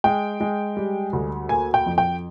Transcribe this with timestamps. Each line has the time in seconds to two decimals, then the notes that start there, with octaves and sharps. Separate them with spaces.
0.04 G#3 G5
0.40 G#3
0.77 G3
1.13 D2
1.49 A#3 G#5
1.74 G5
1.86 F2
1.98 G5